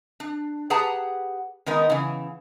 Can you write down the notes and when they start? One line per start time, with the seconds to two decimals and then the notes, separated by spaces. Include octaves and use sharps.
0.20 D4
0.70 G4 G#4 B4 F#5 A5 A#5
1.66 D#3 G#3 B3 D#4 A#4
1.90 C#3 E3